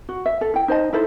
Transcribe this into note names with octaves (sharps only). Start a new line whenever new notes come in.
F#4
E5
A4
E4 G5
D#4 C5 D#5 A5
D#4 E4 A4 C5